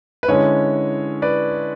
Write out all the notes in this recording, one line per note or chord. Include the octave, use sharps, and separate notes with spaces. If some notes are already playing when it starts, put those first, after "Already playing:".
B4
D3 G#3 C#4 E4 C#5
B4 D5